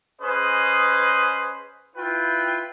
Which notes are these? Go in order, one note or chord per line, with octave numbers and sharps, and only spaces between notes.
C#4 G#4 B4 C5 D#5
E4 F4 B4 G5